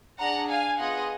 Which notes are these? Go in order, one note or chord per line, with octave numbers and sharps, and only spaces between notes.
D4 G#4 F#5 A#5
F5 G#5
B3 F4 G#4 D#5 F#5